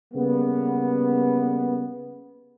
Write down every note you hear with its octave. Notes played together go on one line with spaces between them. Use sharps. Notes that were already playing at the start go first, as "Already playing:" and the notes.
C#3 G3 A#3 B3